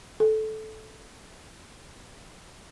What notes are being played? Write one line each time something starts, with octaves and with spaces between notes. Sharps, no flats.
A4